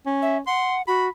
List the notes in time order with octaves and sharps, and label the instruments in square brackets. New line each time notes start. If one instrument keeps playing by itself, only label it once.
[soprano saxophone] C#4
[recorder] E5
[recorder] F#5 [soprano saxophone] C6
[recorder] F#4 [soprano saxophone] B5